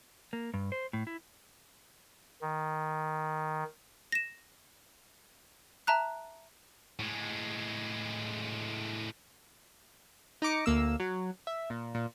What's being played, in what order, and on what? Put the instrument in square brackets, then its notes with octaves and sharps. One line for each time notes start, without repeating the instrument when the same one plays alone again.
[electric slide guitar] A#3
G2
C5
A2
E4
[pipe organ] D#3
[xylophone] A#6 E7
E5 A5 A#5 F#6
[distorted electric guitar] A2 G#3
[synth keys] D#4 A#5 D6 C#7
D2 A#3 E6
F#3
E5
A#2
A#2